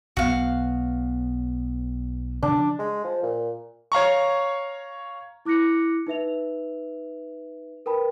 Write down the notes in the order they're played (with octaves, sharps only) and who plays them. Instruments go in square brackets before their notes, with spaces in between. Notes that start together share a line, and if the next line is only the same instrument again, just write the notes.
[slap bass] B1 B2 B3 [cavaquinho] F#4 F5
[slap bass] C#3 F3 [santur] D4
[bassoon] G#3
F3
A#2
[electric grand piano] C#5 F5 A#5 C#6
[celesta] E4 D6 F#6 A#6 C#7
D#4 B4 E5 F7
A#4 B4 G5 A5 B5